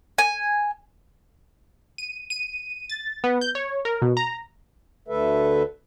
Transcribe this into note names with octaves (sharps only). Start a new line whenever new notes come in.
G#5
D#7
D#7
A6
B3
G6
C#5
A#4
B2
A#5
D2 D3 A3 A4 B4 E5